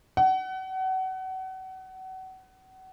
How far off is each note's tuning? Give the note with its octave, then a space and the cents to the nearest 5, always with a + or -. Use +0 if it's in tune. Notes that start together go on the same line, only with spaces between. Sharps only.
F#5 +30